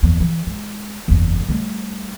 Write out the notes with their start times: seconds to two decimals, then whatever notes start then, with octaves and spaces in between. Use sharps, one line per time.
0.03 F#1 E2
0.20 E3
0.47 G#3
1.08 F#1 E2
1.49 G3 A3